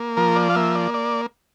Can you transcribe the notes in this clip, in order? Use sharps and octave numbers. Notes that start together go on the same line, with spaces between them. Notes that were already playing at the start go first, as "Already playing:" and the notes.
Already playing: A#3
F3 A#4
D5
F5
A#3 E5
D5
D5